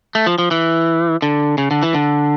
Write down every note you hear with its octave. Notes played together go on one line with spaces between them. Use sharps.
A3
F3
F3
E3
D3
C#3
D3
E3
D3